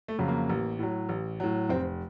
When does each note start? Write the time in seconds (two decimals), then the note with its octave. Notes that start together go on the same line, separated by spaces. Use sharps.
0.08 A3
0.19 F2 C#3 F#3
0.28 A#3
0.49 A1
0.79 A2 F#3
1.09 A1
1.40 A2 F#3
1.69 F1 C4